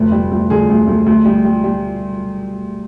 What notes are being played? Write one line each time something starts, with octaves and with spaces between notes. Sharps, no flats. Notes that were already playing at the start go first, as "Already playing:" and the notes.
Already playing: F1 D2 B4
G3
D2
D3 G#4
D2
D2
D2
G3
G3
G3